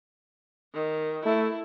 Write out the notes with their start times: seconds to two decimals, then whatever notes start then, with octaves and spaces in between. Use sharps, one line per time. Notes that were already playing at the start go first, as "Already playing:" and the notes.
0.74 D#3
1.25 A3 E4